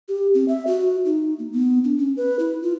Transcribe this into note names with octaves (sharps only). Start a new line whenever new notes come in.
G4
C4
E5
F#4
D#4
A#3
B3
D4
C#4
B4
E4
F4